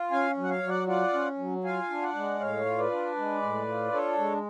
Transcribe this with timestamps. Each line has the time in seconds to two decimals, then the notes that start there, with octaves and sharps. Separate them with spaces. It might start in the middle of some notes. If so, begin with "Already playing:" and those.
Already playing: F4
0.11 C#4 F5 G#5
0.37 F#3
0.43 F#5
0.49 C#5 F5
0.63 F#3
0.68 D5 F#5
0.87 F4 D5 F#5
1.13 C#4
1.39 F#3
1.64 F4 F5 G#5
1.90 D4
2.02 D5 F#5
2.15 G#3
2.40 A2 C#5 F5
2.65 F4
2.78 B4 D5
2.91 D4
3.16 G#3
3.42 A2
3.68 F4
3.93 D4 A4 C#5
4.18 G#3